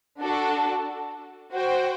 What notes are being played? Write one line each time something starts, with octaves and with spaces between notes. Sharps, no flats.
D4 F#4 A4
F#4 C5 G5